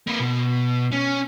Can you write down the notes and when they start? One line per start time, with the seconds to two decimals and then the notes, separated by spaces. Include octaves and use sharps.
0.07 A#3 B4
0.19 B2
0.92 C#4